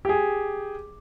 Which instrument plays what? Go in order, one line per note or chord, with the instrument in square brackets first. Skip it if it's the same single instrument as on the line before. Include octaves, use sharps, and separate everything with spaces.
[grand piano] G4 G#4